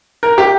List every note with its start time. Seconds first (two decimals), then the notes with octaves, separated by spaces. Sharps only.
0.23 A#4
0.38 G4